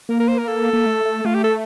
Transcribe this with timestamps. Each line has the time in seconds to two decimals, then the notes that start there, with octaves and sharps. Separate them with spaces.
0.09 A#3 A#4
0.19 A#4
0.28 C5
0.38 A#4
0.47 A4
0.73 A#3
0.86 A3
1.05 A3
1.25 A3 F4
1.34 G4
1.44 A4